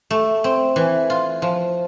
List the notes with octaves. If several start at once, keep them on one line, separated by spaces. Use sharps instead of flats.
A3
C4
E3
F4
F3